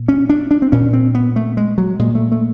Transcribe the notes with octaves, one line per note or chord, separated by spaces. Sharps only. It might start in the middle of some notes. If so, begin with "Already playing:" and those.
Already playing: A#2
C#4
D4
D4
C4
A#2 C#4
C4
B3
A3
G#3
F#3
A#2 G#3
A3
A3